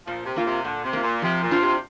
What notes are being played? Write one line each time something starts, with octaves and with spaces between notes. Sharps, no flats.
A#2 F3
C3
A#2 A#3 F4
C3
A#2 D3
C3
A#3 F4
A#2
C3 F3
A#2
D4 F4 C5
C3